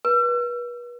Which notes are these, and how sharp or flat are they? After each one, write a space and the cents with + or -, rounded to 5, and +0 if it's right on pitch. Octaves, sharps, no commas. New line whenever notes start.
B4 -35